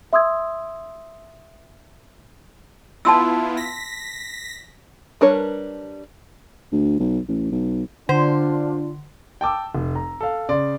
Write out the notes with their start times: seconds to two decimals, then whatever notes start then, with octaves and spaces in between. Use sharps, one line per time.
0.13 E5 C6 D#6 E6 G#6
3.05 B3 E4 F4 A5 C6 E6
3.57 A#6 B6
5.21 G3 D4 A#4 B4 C#5
6.72 D2
6.99 B1
7.28 A1
7.52 B1
8.09 D3 D4 F4 C5
9.41 G5 A5 D6 E6
9.75 F1
9.96 A#5
10.21 A4 F5
10.49 C#3 D5 C6